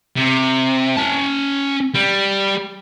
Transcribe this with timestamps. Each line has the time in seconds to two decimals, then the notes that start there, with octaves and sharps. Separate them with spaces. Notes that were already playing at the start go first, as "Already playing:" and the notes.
0.17 C3
0.97 C#4 A5
1.94 G3